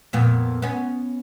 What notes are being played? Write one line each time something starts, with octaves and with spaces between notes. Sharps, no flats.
F2 A#2 B3
B3 C#4